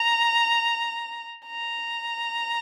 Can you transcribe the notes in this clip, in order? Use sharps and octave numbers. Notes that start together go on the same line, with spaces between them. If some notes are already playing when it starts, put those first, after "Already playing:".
Already playing: A#5
A#5